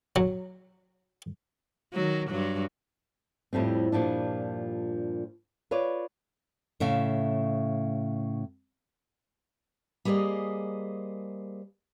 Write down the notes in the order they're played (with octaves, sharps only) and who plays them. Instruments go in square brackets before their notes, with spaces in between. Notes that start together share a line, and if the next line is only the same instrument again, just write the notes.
[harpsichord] F#3
[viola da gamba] D#3 F#3
G2 F#3
[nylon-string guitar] F2 A2 G3 A3 C4
G2 A#2 F3 G3 D4
F4 B4 C#5 D5
A2 C#3 E5 F5
[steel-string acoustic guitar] G3 A#3 G#4 C5 D#5